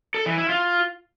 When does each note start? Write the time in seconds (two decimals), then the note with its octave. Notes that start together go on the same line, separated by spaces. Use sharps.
0.14 A4
0.26 E3
0.38 E4
0.49 F4